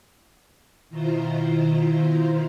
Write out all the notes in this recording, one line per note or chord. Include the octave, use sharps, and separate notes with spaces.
B2 D#3 E4 F4 C5 A#5